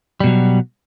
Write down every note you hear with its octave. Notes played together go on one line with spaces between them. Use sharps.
B2 F#3 G3